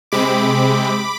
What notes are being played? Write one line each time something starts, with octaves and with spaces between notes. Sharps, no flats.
C3 G#3 C4 B5 D6